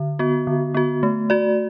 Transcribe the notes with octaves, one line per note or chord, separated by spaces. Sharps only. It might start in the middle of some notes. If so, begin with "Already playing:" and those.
Already playing: D3
B3 F#4
D3
B3 F#4
A3
F#4 D5